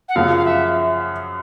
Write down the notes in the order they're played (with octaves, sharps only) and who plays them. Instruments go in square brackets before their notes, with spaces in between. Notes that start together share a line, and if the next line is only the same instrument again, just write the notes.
[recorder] F#5
[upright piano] F#2 C#3 F3 [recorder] F5
[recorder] F5
E5